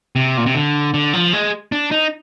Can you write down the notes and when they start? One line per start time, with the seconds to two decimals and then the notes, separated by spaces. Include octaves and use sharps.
0.16 C3
0.37 A#2
0.46 C3
0.55 D3
0.94 D3
1.13 F3
1.33 G#3
1.72 D4
1.91 D#4